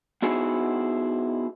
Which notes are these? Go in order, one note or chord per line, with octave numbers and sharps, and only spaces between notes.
B3 D#4 E4 F#4 G#4 C5